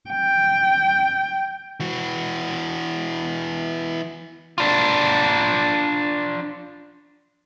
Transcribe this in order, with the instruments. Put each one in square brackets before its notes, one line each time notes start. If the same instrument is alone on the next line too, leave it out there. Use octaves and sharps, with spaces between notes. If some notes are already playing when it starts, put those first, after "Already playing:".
[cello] G5
[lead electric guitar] E3 F#4
D4 F4